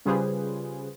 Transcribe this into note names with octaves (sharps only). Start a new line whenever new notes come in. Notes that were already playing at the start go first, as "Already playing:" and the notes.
C#3 G3 F4 G#4 B4 C5